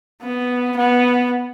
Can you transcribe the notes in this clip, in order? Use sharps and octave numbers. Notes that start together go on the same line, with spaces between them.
B3
B3